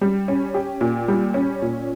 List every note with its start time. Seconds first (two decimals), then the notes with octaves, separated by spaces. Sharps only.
0.01 G3
0.28 C#4
0.54 G4
0.81 A#2
1.08 G3
1.34 C#4
1.62 A#2